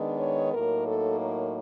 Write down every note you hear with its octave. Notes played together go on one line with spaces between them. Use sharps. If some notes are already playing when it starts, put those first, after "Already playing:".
Already playing: D#3 G#3 B3 D4
C#5
A2 F#3 A#3 D#4 A#4
A4
A#4